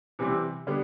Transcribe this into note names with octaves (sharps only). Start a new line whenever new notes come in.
C3 E3 G3 C4
D3 G3 B3